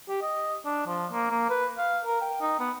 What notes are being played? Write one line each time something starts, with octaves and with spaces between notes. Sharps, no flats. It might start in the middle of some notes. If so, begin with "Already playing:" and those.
G4
D#5
D4
F3
A#3
A#3
B4
F5
A#4
G5
D#4
B3